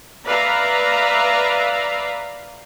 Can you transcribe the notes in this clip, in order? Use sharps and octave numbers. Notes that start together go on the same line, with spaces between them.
B4 D5 E5 F5 A#5